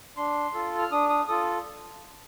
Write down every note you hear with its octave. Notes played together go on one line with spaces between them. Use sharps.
D4 C6
F4 A4
F6
D4 D#6
D#6
F4 A4 D#6